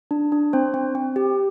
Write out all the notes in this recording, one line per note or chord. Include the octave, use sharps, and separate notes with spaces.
D4
D4
C4 C5
C4
C4
G4